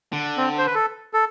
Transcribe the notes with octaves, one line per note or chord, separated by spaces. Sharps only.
D3
C4
C5
B4
A4
A4